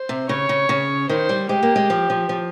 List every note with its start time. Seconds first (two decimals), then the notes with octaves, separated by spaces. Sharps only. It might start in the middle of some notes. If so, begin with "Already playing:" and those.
Already playing: C5
0.09 C3
0.29 C#3 C#5
0.49 C#3
0.69 C#3
1.09 D#3 C5
1.29 G3
1.49 G#3 G4
1.63 A#3
1.76 G#3
1.90 F3
2.10 F3
2.29 F3